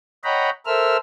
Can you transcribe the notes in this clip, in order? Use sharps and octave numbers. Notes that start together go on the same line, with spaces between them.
C#5 D#5 F#5 G5 A#5 B5
A4 A#4 C5 E5 E6 F6